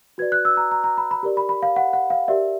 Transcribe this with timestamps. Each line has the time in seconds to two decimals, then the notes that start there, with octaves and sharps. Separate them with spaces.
0.18 F#4 B4 D5 G#6
0.32 F#6
0.45 E6
0.57 A#5
0.72 A#5
0.84 A#5
0.98 B5
1.11 B5
1.23 G4 A#4 D5
1.37 B5
1.49 B5
1.63 F5
1.76 F#5
1.93 F#5
2.10 F5
2.28 G4 A#4 D5 E5